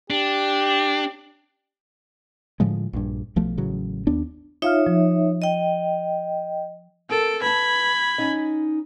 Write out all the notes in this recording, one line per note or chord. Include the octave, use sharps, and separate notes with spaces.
D4 G4
A2 D3 F3 G#3
A#1 G2
B1 F3 A3
A1 C#3 F#3
D#2 B3 D4
D#4 F4 C#5 E5 F5 F6
F3
D#5 G5
C4 A4 A#4 D7
B4 A5 B5 G#6
C#4 D#4 D#5